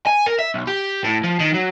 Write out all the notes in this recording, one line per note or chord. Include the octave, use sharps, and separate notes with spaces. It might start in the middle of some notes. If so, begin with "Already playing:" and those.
G#5
A#4
E5
B1
G4
A2
F3
D#3
F#3